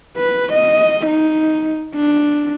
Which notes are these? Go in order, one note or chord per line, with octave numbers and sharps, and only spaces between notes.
B4
D#5
D#4
D4